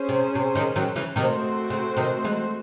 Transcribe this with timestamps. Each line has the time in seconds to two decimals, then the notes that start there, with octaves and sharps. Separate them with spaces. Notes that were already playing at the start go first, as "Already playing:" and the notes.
Already playing: C#4 G#4 C5
0.09 C3
0.35 C3
0.55 C3 D#3
0.76 D#3 F#3
0.96 C#3 E3
1.16 C3 D#3 A3 C4 F#4 C5
1.70 C#3
1.97 C3 D#3
2.25 E3 G#3